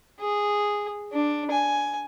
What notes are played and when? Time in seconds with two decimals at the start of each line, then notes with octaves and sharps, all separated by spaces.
0.20 G#4
1.13 D4
1.51 G#5